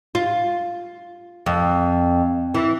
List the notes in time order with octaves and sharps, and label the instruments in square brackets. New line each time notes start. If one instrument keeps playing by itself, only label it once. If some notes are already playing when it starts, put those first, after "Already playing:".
[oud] F4
F2
E3